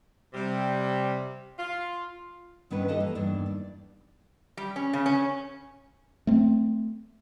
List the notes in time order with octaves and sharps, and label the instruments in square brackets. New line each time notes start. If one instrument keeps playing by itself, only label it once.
[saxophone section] C3 G3
F4
[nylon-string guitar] G2 D#3 B3 C#4 D4 B4
G4 A4 B4 D#5 F5 A5
E3 A#3
E2 G2 D#3 A#3 D4
D5
[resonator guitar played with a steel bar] G3
C#4
C#3
C#4
[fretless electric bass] A3 C4